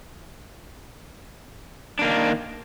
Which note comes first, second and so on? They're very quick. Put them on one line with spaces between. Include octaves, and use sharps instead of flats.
D4 A#3 D#3